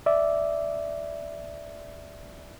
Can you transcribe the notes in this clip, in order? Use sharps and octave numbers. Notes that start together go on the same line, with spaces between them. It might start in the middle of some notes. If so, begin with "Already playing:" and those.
D5 E5